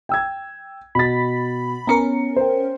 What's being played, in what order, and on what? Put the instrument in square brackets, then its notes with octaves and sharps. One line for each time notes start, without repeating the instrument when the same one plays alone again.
[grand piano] G5 E6 G#6
[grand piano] B2 A6 [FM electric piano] B5 B6
[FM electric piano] B3 C#4 A#4 [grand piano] A#5 C#7
[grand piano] C5 G5